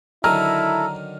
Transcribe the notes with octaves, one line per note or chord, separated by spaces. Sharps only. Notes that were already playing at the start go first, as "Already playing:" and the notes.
D3 D#3 F#3 E4 A4 A#5 F6